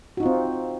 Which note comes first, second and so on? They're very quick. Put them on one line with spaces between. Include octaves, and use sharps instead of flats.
F#4 D#4 F4 C4